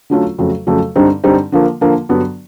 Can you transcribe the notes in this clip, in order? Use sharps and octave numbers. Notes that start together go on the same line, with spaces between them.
D3 F#3 A3 C#4 F4
F2 C#3 F#3 A3
F2 C#3 F#3 A3
G2 D3 G3 C4 D#4
G2 D3 G3 C4 D#4
D3 F3 A#3
D3 F3 A#3
G2 D3 F#3 B3